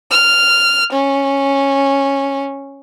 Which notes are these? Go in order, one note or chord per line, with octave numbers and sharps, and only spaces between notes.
F6
C#4